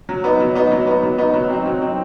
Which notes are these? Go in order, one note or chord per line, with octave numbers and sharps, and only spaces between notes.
F#3
B3 D#4
F#3
B3 D#4
F#3
B3 D#4
F#3
B3 D#4
F#3
C4 D#4
F#3
C4 D#4